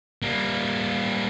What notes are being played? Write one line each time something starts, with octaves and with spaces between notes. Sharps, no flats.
G3 A#3